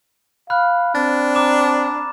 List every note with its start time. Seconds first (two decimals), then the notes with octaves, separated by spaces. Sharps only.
0.50 F5 B5 F6 F#6
0.95 C4 D4 A6
1.35 A#5 D6 E7